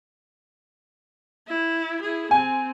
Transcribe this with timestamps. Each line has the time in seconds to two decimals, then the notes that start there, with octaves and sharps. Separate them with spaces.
1.48 E4
2.01 E4 G#4
2.31 C4 G#5